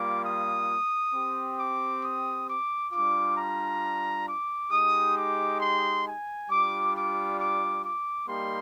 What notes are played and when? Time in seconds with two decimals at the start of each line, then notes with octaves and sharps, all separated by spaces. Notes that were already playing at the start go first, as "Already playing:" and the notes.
Already playing: G3 A#3 F4 D6
0.24 D#6
1.14 C4 G4
1.59 D6
2.03 D#6
2.48 D6
2.92 G3 D4 F4 D6
3.36 A#5
4.27 D6
4.71 G#3 D#4 G4 D#6
5.16 D6
5.60 C6
6.05 G#5
6.50 G3 D4 F4 D6
6.94 D6
7.39 D6
7.85 D6
8.29 G3 A#3 D#4 G4 C6